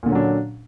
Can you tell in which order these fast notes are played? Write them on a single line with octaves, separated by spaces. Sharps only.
A#2 D3 C#4 F#3 D4